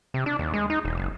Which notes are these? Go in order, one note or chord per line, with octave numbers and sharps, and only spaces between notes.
C3
D4
D#2
G#3
D#4
E1
F#1